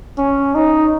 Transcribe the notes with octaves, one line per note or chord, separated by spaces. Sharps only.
C#4
D#4